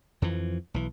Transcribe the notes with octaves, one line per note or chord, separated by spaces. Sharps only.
F2 E3 F3
B1 E3